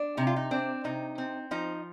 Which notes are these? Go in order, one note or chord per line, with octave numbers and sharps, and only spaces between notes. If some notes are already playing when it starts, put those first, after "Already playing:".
Already playing: D4
C3 D#4
F4
D#4
C4 D4
C3 D#4
C4
F3 D#4